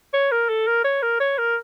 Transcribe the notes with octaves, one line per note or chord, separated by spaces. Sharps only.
C#5
A#4
A4
A#4
C#5
A#4
C#5
A#4